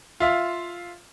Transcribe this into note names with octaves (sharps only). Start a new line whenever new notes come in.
F4 E5 F5